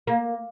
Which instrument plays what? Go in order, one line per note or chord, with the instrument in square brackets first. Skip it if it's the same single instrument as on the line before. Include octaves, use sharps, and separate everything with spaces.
[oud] A#3